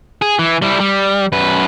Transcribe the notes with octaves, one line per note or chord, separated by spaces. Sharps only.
G#4
E3
G3 E4
G3
F#2 B4